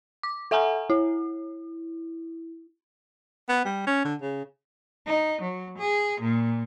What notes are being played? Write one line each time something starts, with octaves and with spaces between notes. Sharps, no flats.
D6
A4 E5 F#5 G#5 A#5
E4
B3
G3
C#4
D3
C#3
D#4
F#3
G#4
A#2